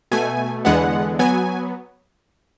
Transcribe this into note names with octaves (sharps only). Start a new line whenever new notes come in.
B2 A3 G#5
E2 D3 G#3 B3 F#5
F#3 B3 G#5